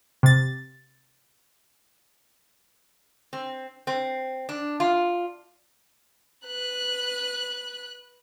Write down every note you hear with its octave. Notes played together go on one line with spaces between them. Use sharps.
C3 A6
C4
C4
D4
F4
B4 F#6